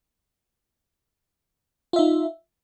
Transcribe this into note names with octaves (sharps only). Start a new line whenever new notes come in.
D#4 F4 E5